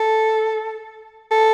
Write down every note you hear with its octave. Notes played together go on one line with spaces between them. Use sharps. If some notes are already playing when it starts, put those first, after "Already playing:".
Already playing: A4
A4